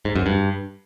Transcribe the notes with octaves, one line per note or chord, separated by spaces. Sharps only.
G#2
F#2
G2